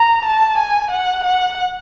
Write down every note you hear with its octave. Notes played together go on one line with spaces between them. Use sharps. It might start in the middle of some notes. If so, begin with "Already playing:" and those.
Already playing: A#5
A5
G#5
F#5
F#5